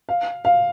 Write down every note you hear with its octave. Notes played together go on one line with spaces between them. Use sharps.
F5
F5